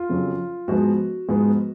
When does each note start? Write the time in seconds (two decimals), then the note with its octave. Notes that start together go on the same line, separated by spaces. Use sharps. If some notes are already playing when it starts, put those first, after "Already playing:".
Already playing: F4
0.09 F2 C#3 F#3
0.68 G#2 F3 G#3 B3 F#4
1.28 G#2 F3 G#3 B3